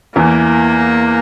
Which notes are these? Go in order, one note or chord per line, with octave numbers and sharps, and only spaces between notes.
E2 E3 A#3